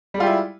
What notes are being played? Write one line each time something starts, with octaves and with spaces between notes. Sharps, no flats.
G3 G#3 E4 F4 G4